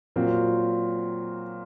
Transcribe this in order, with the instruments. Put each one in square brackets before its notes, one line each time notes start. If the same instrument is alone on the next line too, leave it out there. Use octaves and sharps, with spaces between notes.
[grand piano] A#2 F#3 C4 F4